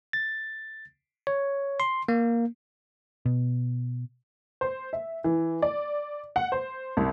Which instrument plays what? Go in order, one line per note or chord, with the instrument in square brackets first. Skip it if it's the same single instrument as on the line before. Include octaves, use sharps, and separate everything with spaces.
[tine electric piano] A6
C#5
C6
A#3
[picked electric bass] B2
[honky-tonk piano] C5
E5
E3
D5
F#5
C5
C2